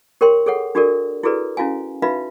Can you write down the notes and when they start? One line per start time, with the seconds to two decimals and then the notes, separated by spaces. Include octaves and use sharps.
0.21 G4 A#4 C#5 G5 C6
0.46 G#4 A4 C#5 F#5
0.75 D4 F#4 G4 A4 A#4 D5
1.23 E4 F#4 G#4 A4 B4 D5
1.57 C#4 E4 F#4 F5 G#5
2.02 D#4 F#4 B4 E5 F5 B5